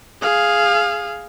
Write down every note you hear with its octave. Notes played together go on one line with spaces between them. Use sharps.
G#4 F5